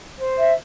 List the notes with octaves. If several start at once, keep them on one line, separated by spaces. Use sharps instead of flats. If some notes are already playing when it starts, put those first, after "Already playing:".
C5
E5